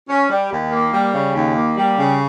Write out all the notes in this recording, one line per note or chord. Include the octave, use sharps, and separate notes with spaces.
C#4
G3
D#2
A#3
G3
C#3
D#2
A#3
G3
C#3